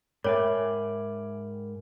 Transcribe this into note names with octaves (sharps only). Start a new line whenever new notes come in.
G#2 A#4 C#5 E5 G5 G#5 B5 D6